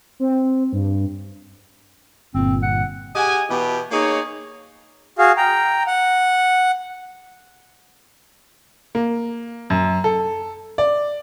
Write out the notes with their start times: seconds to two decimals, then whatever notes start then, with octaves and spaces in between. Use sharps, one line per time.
0.20 C4
0.73 G2
2.34 G1 A#2 C4
2.63 F#5
3.15 G4 G#4 D#5 F#5 G#5
3.49 B2 E3 G4
3.91 A#3 D#4 G#4 C#5
5.18 F#4 G#4 F5
5.37 G5 A#5
5.87 F#5
8.95 A#3
9.70 F#2
10.04 A4
10.78 D5